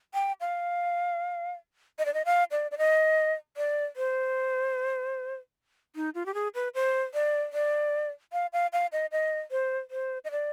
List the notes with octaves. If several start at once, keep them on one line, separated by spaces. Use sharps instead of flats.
G5
F5
D#5
D5
D#5
F5
D5
D5
D#5
D5
C5
D#4
F4
G4
G#4
B4
C5
D5
D5
F5
F5
F5
D#5
D#5
C5
C5
D#5
D5